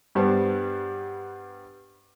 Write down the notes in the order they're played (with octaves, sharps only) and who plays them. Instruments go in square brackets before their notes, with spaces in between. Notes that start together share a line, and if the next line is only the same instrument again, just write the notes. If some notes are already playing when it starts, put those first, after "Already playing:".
[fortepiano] G2 G3 B3 C5 A5